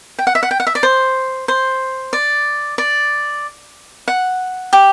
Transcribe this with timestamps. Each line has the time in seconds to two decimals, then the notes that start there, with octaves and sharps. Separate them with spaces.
0.19 G5
0.27 F#5
0.35 E5
0.43 F#5
0.51 G5
0.60 F#5
0.67 E5
0.75 D5
0.83 C5
1.48 C5
2.13 D5
2.78 D5
4.08 F#5
4.73 G4